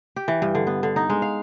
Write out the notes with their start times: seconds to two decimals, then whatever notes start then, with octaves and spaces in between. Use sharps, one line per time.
0.16 G4
0.28 E3
0.42 G2
0.55 D3
0.67 B3
0.83 D3
0.96 D#4
1.10 G#3
1.22 F5